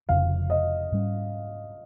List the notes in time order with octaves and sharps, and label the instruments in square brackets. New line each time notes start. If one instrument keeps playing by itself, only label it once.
[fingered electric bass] F1 F2 C#3 F3 [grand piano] F5
[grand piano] D#5
[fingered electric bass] G#2 G3 C#4